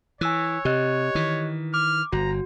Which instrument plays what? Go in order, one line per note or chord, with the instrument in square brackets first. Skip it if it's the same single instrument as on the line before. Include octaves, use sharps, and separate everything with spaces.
[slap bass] E3 [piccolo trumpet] C#5 [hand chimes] G#5 E6 F#6
[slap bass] C3 [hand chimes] G4 D#5 F#6
[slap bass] D#3 E3
[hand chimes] D6 [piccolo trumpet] F6
[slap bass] G1 [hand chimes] F#4 [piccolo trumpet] A#5